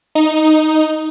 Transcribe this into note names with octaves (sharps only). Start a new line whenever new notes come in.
D#4